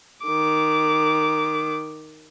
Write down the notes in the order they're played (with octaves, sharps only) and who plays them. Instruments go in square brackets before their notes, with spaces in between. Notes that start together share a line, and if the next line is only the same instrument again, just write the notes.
[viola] D#3 D6